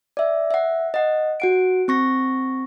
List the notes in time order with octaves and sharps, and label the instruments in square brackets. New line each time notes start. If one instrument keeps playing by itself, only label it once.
[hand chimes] D5 E5
E5 F#5
D#5 F#5
F#4 F#5 D7
C4 C#6 A#6